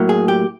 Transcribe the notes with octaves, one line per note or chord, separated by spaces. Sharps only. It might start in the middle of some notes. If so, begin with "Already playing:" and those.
Already playing: A2 F#3 A#3
G#4
G4